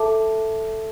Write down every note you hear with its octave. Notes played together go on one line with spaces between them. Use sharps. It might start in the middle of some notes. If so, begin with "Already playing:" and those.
Already playing: A4 E5 A5 D6